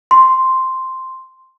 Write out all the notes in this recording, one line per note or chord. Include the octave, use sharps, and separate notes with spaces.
C6